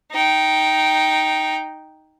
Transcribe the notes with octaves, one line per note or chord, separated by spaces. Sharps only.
D#4 G5